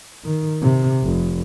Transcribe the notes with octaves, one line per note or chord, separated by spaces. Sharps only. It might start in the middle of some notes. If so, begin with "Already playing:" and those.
D#3
C3
F1